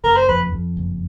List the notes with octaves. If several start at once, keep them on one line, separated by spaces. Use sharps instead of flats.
F#1 A#4
C5
F2 B4
F2
F#1